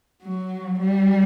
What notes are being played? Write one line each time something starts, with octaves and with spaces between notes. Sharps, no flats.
F#3
G3